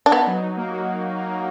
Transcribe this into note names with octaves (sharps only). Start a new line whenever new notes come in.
D4
B3 D#4
F#3
D#4
A#3
F#4